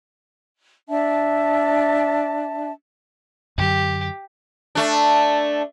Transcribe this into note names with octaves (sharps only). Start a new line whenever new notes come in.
D4 E5 A5
F#2 D3 F#3 G4
A3 D4